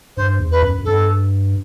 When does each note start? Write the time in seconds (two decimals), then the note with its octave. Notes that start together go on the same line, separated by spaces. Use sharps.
0.17 G2 C5
0.40 E2
0.52 B4
0.62 F#2
0.78 F#2
0.85 G2 A4